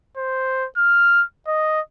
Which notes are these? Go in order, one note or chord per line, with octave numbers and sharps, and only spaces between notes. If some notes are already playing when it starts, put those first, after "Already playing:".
C5
F6
D#5